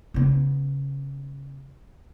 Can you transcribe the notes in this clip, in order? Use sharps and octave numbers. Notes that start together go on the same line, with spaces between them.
C#3 B3